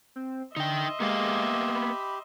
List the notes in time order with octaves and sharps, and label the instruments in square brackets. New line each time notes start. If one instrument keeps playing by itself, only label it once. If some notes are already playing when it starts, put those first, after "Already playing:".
[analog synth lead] C4
[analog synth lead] D3 [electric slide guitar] D#4 G5 [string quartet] D#5 E5 C6
[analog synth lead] G#3 [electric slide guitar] A#3 B3 F5 [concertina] G4
[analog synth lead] B5